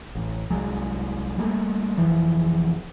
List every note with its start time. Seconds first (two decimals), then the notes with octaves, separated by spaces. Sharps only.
0.15 A1
0.50 C2 F#3 G#3
1.38 G3 A3 A#3
1.98 F1 F2 E3 F3